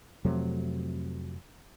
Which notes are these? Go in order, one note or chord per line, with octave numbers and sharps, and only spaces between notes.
F2 C3 F#3 A3